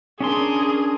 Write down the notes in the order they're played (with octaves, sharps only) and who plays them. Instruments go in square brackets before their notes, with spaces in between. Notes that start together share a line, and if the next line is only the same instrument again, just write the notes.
[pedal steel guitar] C#4 D4 C6 [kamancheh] G#4 A#4